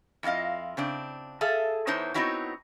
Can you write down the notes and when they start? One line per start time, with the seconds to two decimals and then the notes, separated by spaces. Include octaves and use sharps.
0.23 F2 E4 F4 D#5 F5
0.77 C#3 C4 D4
1.41 G#4 A4 E5 F5
1.87 E2 E3 D#4 C5 C#5 A5
2.14 B3 C4 D#4 E4 F#4 C#5